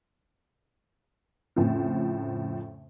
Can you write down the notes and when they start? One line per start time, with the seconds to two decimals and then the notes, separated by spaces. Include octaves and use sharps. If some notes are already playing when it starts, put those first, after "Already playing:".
1.56 F2 A2 C#3 F3